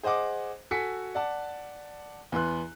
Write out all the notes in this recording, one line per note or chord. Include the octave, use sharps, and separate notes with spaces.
G#4 C5 D#5 F#5 D6
F#4 A4 G#5 B6 C#7
D5 F#5 A5
E2 B3 C6 F#6